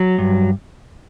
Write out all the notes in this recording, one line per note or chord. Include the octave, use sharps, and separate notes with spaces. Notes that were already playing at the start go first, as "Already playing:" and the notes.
Already playing: F#3
G2